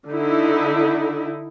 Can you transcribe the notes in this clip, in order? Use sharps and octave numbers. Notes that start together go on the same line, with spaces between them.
D3 D#4 E4